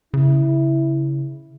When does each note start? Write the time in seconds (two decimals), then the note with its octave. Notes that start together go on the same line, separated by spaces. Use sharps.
0.14 C#3 E4